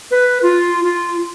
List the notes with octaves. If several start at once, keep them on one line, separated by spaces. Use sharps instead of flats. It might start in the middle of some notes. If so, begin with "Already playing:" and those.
B4
F4
F4